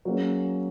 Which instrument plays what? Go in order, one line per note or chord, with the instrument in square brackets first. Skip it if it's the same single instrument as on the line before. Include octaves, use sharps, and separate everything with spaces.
[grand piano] F#3 A#3 C#4 G#4